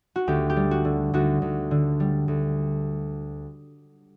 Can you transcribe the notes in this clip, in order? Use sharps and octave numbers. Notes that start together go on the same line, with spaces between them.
F#4
D2 G4
G4
G3
F#4
D3
D2 F#4
D2
D3
G3
D2